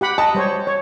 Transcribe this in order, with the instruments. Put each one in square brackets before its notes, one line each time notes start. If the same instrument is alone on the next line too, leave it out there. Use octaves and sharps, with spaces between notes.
[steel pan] G4 F#5 B5
[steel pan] D#5 [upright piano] A5
[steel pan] G3 C5 C#5
C#5